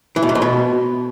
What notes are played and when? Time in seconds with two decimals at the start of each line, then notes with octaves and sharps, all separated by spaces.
0.16 E3
0.23 B2
0.29 G#2
0.35 F2
0.42 B2